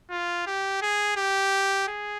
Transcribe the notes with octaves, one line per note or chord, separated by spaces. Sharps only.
F4
G4
G#4
G4
G#4